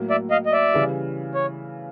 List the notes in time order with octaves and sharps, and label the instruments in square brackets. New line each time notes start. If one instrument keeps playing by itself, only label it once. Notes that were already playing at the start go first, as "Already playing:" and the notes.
Already playing: [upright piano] A2 F#3 A#3
[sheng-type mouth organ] D5 E5
D#5 F5
D#5
D5 E5
[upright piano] C#3 E3 G3
[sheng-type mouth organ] C#5